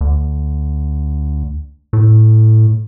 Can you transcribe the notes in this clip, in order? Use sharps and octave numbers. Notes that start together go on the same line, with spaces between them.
D2
A2